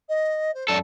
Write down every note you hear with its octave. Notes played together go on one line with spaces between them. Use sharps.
D#5
C5
F#2 A4 D5